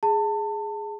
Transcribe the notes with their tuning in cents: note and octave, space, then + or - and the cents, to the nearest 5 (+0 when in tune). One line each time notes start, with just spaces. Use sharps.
G#4 +0 A5 +25